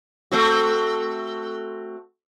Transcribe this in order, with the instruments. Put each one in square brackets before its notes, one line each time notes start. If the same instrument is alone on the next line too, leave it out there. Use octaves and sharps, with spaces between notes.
[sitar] A3 C4 F#4